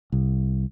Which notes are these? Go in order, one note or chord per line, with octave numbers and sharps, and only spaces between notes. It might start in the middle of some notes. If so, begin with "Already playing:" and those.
C2